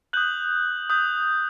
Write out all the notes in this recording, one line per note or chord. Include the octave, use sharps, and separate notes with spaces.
D#6 F#6 G6 F#7
D#6 G6